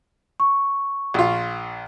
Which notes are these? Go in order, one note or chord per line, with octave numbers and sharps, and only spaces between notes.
C#6
A#1 F4